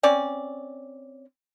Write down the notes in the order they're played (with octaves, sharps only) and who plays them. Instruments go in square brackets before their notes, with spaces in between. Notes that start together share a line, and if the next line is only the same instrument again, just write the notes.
[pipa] C4 C#4 D5